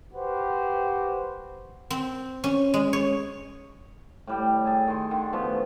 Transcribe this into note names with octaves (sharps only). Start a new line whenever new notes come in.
F#4 G4 B4 C5
C4
C#4
G#3
C#5
A2 G3 G5
G#4 A4
D#3 C6
D3 D#3
B2 F3 A3